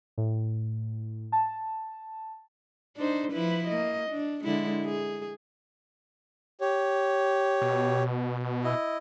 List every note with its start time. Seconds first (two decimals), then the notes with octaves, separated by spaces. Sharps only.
0.18 A2
1.32 A5
2.97 D4 D#4 C5
3.32 F3 E4 B4
3.68 A#3 D#5
4.10 D4
4.44 D3 G#3 E4
4.85 G#4
6.61 G4 C#5
7.62 B2
8.64 E4 D#5